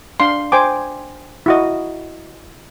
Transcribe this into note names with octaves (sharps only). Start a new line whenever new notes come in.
D4 F5 C6
C5 G5 G#5 D6
E4 F#4 D#5